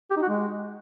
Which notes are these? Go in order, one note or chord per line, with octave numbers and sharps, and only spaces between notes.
G4
D#4
F#4
G#3